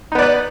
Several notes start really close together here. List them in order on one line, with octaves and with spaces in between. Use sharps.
D#4 B3 D5 B4